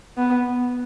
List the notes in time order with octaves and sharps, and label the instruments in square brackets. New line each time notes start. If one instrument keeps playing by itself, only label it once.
[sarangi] B3